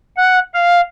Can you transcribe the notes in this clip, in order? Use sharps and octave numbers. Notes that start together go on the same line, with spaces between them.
F#5
F5